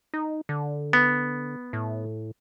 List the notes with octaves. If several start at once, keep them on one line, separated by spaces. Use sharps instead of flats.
D#4
D3
B3
A2